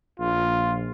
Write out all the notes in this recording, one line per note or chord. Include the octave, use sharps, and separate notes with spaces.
A#1 F4